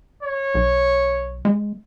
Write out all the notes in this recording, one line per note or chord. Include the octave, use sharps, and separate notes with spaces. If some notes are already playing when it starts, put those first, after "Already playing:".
C#5
B1
G#3